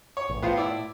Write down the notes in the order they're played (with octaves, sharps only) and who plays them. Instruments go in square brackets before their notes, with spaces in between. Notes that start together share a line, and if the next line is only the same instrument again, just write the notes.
[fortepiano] C#5
[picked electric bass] A1
[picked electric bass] A2 [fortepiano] B3 F4 C5
[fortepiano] E4 D5 E6